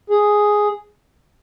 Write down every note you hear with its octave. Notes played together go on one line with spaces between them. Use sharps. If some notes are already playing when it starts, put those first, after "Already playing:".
G#4